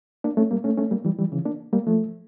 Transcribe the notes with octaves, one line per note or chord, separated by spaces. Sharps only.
A#3 D4
A3 C#4
G3 A#3
A3 C#4
A3 C#4
G3 A#3
E3 G3
E3 G3
C#3 E3
A#3 D4
G3 A#3
F3 A3